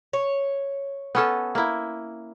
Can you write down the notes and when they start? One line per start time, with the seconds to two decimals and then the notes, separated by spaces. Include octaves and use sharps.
0.13 C#5
1.15 B3 C#4 A4
1.55 A#3 E4